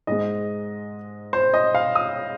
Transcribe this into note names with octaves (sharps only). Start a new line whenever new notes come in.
G#2 G#3 D#5
C5
D#5
F5
D#6